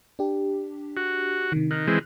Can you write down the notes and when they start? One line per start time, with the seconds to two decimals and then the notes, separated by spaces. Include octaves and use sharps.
0.19 D4 G4
0.97 F#4
1.52 C3 D#3
1.71 D#3 F6 F#6
1.87 E3 G#3 C4